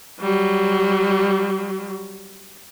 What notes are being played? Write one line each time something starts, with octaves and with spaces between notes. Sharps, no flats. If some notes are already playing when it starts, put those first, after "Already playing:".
F#3 G3